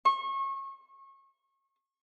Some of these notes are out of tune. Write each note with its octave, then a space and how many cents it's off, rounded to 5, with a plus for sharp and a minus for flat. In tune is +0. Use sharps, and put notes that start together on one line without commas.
C#6 -30